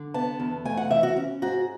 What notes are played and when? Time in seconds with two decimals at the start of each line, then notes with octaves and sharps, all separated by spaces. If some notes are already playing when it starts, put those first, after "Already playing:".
Already playing: D3
0.14 B3 A5
0.40 E2
0.65 A3 G#5
0.77 F#5
0.91 E3 E5
1.03 F#4
1.16 C#4
1.42 G#2 F#4